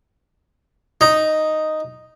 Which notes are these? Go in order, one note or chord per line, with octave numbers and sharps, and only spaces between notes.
D#4